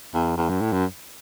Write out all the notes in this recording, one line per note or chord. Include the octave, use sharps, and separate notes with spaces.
E2
E2
F#2
A2
F#2